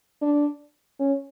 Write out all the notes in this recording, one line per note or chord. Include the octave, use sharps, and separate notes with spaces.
D4
C#4